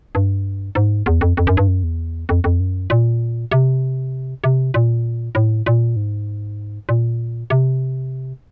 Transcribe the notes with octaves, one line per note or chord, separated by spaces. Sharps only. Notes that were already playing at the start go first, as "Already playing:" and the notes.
G2
G#2
E2
F2
F2
F#2
G2
F#2
E2
F2
F2
F#2
A#2
C3
C3
A#2
A2
A#2
G#2
A#2
C3